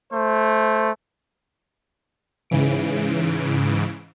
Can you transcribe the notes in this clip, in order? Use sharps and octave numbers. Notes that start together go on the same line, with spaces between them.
A3 C5
G#2 C#3 E3 D7